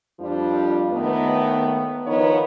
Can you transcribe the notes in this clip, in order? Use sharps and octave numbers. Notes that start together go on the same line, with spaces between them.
F2 F3 G3 D4 F4
D#2 D#3 A3 B3
D#3 F3 B3 D#4 F4 C#5